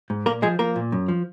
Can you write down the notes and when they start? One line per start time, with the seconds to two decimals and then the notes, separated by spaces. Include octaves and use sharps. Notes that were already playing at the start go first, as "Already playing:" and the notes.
0.10 G#2
0.26 A#2 A#3 A#4
0.42 F3 G#3 G#4
0.59 F3 A#3 A#4
0.76 A#2
0.92 F#2
1.08 F3